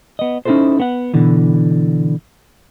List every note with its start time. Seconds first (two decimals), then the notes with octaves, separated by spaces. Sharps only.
0.19 B3 D#5
0.45 C#4 D#4 E4 G4 A4 C5
0.80 B3 F#5
1.14 B2 D3 E3